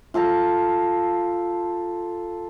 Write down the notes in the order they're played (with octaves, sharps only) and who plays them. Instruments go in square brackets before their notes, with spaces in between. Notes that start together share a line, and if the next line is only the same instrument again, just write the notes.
[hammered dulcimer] F4 A4 A5 A#5